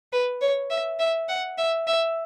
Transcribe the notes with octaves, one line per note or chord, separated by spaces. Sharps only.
B4
C#5
E5
E5
F#5
E5
E5